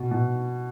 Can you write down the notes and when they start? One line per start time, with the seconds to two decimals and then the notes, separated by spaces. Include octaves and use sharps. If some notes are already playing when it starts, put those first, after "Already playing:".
Already playing: B2
0.11 B2